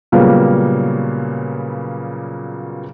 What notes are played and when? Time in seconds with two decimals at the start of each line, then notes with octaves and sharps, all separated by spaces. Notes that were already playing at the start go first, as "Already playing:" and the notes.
0.12 A#2 C#3 F#3 G3 A#3 B3